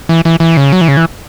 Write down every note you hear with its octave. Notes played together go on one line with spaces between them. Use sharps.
E3
E3
E3
C#3
F#3
E3
C#3
E3